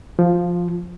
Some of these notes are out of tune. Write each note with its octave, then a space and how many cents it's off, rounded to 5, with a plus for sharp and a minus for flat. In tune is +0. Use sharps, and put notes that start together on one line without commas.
F3 +0 F4 +15